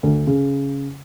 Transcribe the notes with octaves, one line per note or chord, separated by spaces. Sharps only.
D2
C#3